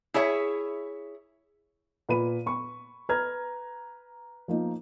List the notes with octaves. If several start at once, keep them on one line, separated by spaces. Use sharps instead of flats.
E4 G#4 C#5 E5
A#2 B4 B5 D#7
B5 C#6
B4 A#5 F6 G#6
F3 A#3 D#4